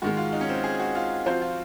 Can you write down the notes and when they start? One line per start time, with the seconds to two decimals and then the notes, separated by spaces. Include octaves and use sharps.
0.02 G#2 D#3 G#3 F#4
0.17 F4
0.33 D#4
0.41 C#4
0.49 C4
0.64 G#4
0.80 F#4
0.95 F4
1.26 F3 C4 F4 F#4 C5
1.42 F4